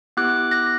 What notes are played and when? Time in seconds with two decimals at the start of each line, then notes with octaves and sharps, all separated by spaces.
0.17 B3 E4 G4 D6 F#6
0.51 F#6 A#6